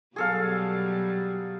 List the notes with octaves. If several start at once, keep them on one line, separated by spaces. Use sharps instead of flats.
B2 F#3 G3 G#4 A4 F5